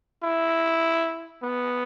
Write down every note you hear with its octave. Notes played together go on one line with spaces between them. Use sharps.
E4
B3